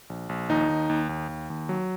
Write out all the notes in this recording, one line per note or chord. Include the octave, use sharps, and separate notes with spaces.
A#1
A#1
D#2 D#4
D#2
D#2
D#2
D#2
D#2
F#3